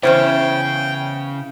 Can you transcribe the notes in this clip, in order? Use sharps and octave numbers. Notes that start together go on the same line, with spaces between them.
E2 C#3 C#4 E4 C5 G5